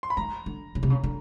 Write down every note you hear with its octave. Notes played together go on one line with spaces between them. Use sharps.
C6
B5
D#3 A#5
D3
C#3
C3
C#3
D3